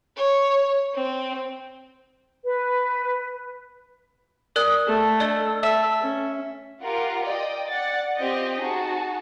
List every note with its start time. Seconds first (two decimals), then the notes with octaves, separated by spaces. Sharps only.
0.16 C#5
0.95 C4
2.44 B4
4.56 A#4 D5 D#6 F#6
4.87 A3 A4
5.20 D4 D5 D#5 G7
5.63 E5 A5
6.02 C#4
6.83 F4 G4 A#4 F5 F#5
7.26 D5 D#5 G5
7.70 D5 F#5 A6
8.18 C4 F4 G4 D#5 G5
8.61 D#4 F#4 G#4 A5